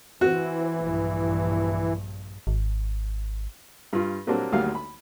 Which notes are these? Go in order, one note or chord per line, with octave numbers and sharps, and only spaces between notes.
E3 C4 F#4
A#1 G2
G#1
G2 F4
A#2 F#3 G3 A#3 C4 D4
G#1 D2 F#3 G3 A#3 F5
B5